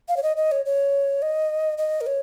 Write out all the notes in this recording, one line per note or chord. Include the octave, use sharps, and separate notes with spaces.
F5
C#5
D#5
D#5
C#5
C#5
D#5
D#5
A#4
C#5